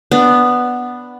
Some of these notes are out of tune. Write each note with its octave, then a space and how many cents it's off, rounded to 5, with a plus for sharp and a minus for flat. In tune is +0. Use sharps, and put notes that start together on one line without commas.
B3 +0 D4 +0